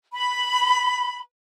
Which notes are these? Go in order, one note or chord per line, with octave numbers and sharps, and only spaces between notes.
B5